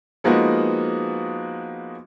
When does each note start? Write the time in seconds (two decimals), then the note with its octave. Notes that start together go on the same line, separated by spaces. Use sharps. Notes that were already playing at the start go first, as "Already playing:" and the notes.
0.24 F3 G#3 A#3 B3 D#4 F#4